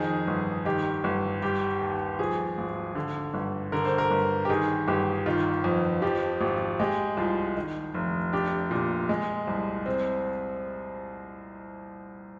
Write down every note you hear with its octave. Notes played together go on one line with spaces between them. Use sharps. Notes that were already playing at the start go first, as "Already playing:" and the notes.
Already playing: F2 D#3 G#4
G1
D#3 G4
G1
G3 G4
D#2
F3 G#4
G#1
D3
G1
D3 A#4
C5
A#4
G1
G4
D#3 G#4
G1 G4
D#3 F4
F2
F3 G4
G#1 G4
G#3 G4
C2 F4
D#3
F1
D4 G4
A#2
G#3
C2
C4